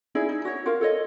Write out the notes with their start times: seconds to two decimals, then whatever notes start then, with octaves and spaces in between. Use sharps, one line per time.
0.15 D#4 E4 G#4 D5
0.29 D#4
0.45 F#4 C#5
0.66 F4 F#4 A#4 F5
0.81 A4 C#5 D#5